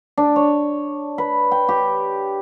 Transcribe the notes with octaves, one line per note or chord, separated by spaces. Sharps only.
D4
C#5
B4
G5
G4